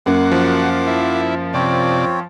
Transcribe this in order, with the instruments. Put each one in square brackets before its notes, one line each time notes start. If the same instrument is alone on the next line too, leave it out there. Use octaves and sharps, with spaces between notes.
[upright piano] F#2 A#3 [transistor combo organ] F#4 [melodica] F#5 C6 D6
[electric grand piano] F3
[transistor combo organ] E4
[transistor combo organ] C3 D5 [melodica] C4 F4 C#5